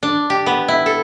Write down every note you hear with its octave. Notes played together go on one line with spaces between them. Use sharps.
D4
G4
B3
E4
A4